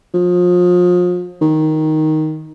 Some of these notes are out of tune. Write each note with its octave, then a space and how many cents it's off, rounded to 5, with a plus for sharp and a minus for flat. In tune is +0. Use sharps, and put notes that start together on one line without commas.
F3 +35
D#3 +5